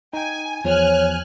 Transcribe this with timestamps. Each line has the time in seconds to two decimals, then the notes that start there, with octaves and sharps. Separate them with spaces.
0.13 D#4 G5 G#5
0.65 E2 F3 C#5 G#5 F6 F#6